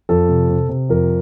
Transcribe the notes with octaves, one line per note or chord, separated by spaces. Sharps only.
F2 A4
C3
C3
C3
F2 A#4